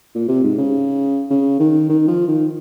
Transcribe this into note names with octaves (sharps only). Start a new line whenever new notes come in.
A#2
C3
G#2
C#3
C#3
D#3
D#3
F3
D#3